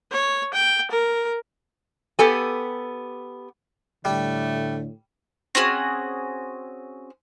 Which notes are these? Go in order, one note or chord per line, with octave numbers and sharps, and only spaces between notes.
C#5
G5
A#4
B3 G4 A4 G#5
A2 D3 G3 A3
C4 C#4 F#4 G#4